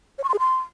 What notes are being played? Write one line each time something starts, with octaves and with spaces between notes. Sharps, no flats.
C#5
C#6
C6
G#4
C6